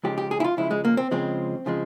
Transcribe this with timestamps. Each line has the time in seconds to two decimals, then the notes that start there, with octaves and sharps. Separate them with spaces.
0.04 C#2 C#3 F3 G#3 G4
0.18 G4
0.31 G#4
0.40 E4
0.44 F4
0.57 C#2 C#3 F3 G#3 E4
0.71 G#3
0.85 A#3
0.97 C4
1.11 C#2 C#3 F3 G#3 C4
1.66 C#3 F3 G#3